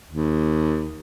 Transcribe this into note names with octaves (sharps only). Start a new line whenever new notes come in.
D#2